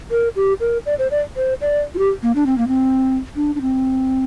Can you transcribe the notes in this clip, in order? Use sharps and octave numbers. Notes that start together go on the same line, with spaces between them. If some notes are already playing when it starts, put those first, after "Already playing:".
A#4
G4
A#4
D5
C5
D5
C5
D5
F4
G4
A#3
D4
C4
A#3
C4
D4
D4
C4